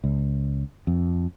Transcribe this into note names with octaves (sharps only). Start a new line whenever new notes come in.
C#2
F2